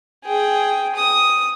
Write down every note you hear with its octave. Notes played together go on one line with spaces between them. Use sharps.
G#4 G5
D#6